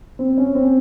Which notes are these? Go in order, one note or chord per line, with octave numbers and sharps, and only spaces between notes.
C4
C#4
C4